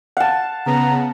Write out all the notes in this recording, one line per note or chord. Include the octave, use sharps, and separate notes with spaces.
F5 F#5 A5
C#3 B3 A#5